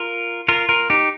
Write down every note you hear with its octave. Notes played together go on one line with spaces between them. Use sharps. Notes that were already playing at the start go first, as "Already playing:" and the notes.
Already playing: F4 A#4
F4 A#4
F4 A#4
D#4 G4